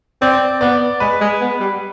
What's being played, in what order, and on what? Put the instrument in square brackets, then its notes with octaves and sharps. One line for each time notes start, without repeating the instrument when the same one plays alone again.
[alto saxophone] C4 [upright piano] D5
[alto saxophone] B3 [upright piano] D5
[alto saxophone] G#3 [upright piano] B4
[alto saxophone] G#3
B3
G3